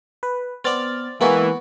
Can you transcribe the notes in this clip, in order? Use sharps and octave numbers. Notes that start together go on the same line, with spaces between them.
B4
B3 C4 D5 F6 A6
E3 G#3 A#3 B3 E4 F#4